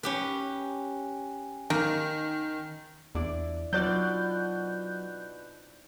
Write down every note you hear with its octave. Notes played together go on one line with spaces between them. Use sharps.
C#4 G4 B4
D#3 A#3
E2 D4 E4 D5
B2 F#3 C4 D#4 F4 D5 F#6 G6